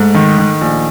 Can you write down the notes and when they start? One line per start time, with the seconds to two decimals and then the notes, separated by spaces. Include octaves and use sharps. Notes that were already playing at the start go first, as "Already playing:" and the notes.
Already playing: G#2 A3
0.14 D#3
0.38 D#3
0.61 A#1